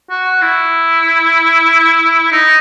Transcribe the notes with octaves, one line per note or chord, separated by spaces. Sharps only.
F#4
E4
D#4